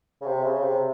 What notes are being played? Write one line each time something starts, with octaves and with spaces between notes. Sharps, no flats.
C#3
C3
C#3
C3